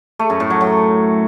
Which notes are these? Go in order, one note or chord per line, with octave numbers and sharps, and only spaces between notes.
A3
F#2
A2
F#3
F#3